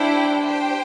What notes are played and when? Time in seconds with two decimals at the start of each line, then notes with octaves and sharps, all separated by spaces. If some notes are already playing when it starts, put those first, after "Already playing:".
Already playing: D4 E4 G4 C5 G5
0.42 G4 C5 G5